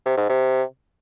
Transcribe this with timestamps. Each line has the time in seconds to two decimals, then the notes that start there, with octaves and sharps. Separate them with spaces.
0.06 C3
0.17 G#2
0.29 C3